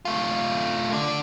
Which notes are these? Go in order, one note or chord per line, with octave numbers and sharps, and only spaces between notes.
A3 F4
D3 D4